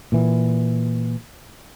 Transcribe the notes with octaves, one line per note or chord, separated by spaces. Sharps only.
A#2 E3